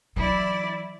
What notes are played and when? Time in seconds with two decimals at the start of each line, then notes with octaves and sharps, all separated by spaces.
0.16 E3 F#3 E4 D5